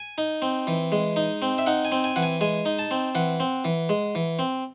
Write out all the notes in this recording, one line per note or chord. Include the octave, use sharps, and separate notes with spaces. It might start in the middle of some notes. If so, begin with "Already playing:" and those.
Already playing: G#5
D#4
C4
E3
G#3
D#4
C4
E5
D#4 F#5
G#5
C4
G#5
E3 F#5
G#5
G#3 G#5
D#4
A5
C4
E3 F#5
C4
E3
G#3
E3
C4